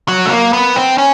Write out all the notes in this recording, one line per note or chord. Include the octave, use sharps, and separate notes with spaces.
F#3
A3
A#3
B3
C4
C#4